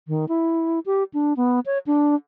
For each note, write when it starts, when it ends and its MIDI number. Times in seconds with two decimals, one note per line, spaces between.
0.08 0.25 51
0.29 0.79 64
0.86 1.03 67
1.14 1.33 62
1.37 1.60 59
1.66 1.78 73
1.87 2.15 62